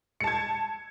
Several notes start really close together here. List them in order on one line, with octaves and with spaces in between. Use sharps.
C#7 A5 G#6